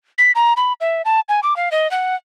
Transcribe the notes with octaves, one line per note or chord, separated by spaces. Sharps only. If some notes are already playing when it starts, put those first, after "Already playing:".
B6
A#5
B5
E5
A5
G#5
D6
F5
D#5
F#5